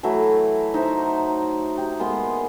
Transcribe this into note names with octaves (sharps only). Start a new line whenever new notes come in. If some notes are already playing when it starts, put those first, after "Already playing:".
E3 F#3 A3 E4
D#4 C5 E5
G4
G#3 A#3 B3 C6